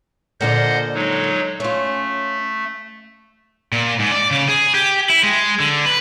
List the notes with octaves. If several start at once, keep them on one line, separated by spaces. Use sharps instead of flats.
A#2 D3 F3 C5 D#5 F#5
F#3 G#3 D#4
A3 C#4 F4
A#2
G#2
D5
C#3
G#4
G4
E4
G#3
D3
B4